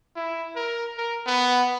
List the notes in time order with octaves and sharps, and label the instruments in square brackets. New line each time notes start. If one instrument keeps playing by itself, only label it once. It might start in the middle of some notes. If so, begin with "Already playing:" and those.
[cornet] E4
A#4
A#4
B3